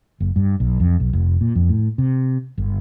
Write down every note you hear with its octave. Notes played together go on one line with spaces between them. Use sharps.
F#1
G2
B1
F2
B1
F1
A#2
F2
A2
C3
G1